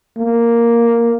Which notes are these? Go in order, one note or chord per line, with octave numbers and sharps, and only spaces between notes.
A#3